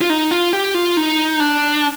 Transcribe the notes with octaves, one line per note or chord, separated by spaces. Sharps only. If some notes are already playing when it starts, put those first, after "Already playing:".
F4
D#4
F4
G4
F4
D#4
D4